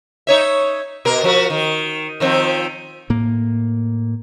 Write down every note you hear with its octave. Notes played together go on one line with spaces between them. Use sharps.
D#4 C#5 E5
B2 A#4
F3 F#4 A#4
D#3
D#3 F3 C4
A2 A#3